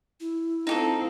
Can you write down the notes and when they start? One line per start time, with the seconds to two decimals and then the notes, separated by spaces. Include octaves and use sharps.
0.20 E4
0.67 C4 D#4 F4 G4 A4